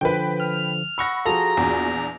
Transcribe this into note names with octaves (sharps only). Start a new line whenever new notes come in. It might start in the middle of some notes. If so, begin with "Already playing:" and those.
D3 F3 B4 G5
F6
F#5 B5 C#6 E6 A#6
F3 F4 F#4 G#4 A4 A#5
A#1 E2